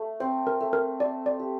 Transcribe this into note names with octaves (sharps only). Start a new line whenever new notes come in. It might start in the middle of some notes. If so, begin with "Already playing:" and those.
Already playing: A3
C4 C5
A#4
A3
A#4
C5 D5
D5
G4